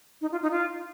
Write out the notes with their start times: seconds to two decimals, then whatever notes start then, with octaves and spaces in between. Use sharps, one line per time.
0.21 D#4
0.32 F4
0.42 D#4
0.51 F4